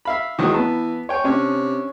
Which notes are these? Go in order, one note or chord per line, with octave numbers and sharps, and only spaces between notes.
E5 F5 B5
D#3 E3 F#3 G#3
B3 A5
C#5 G5 G#5
C3 C#4 D4 C#5